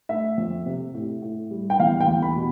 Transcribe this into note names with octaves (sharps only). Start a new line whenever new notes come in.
A3 E5
F2
C3
A2
A2
G3
G5
E2 F5
G5
E2
B5
B2